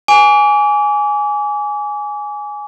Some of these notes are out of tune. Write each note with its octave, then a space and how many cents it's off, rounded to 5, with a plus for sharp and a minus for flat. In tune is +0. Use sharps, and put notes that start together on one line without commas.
G#5 +0 D6 -35